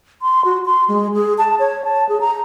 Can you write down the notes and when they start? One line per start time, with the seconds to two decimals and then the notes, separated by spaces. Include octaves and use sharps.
0.22 C6
0.45 F#4
0.65 C6
0.88 G#3
1.14 G#4
1.38 A5
1.59 C#5
1.84 A5
2.09 G#4
2.21 A#5